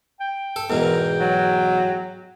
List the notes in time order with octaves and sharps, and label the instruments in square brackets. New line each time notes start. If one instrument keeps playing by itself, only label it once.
[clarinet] G5
[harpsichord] A4
[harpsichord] E2 G#2 B2 [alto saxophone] A#4
[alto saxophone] F#3